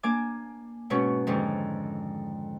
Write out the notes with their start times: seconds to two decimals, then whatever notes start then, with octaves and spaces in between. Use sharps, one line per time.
0.03 A#3 D4 G#5 D6
0.90 G#2 B2 C#4 C#6
1.27 F2 G#2 D3 D#3